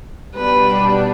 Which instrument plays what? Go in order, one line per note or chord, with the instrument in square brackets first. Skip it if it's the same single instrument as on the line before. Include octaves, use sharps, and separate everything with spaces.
[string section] B2 G3 B3 D4 [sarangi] B4